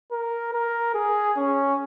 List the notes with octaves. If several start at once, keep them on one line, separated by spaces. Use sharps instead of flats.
A#4
A#4
G#4
C#4